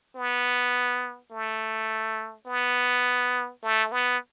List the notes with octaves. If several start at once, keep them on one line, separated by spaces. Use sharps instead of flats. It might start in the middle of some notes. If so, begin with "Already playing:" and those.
B3
A3
B3
A3
B3